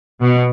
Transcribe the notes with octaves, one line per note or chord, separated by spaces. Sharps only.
B2